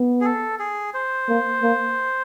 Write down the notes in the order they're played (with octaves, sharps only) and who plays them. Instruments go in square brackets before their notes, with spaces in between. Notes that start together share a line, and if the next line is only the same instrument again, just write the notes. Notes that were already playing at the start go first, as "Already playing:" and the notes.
Already playing: [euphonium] B3
[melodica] G#4
A4
G#4
C5
[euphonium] A#3
A#3